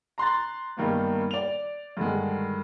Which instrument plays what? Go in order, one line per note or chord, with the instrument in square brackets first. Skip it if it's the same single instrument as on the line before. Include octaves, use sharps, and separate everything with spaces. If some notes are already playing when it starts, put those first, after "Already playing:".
[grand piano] A#5 C6 F#6 A6
G2 D#3 A#3 B3
D5 F7
G2 D3 D#3 G#3